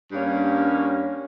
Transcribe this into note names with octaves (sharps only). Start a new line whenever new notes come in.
G2 G3 A#3 C#4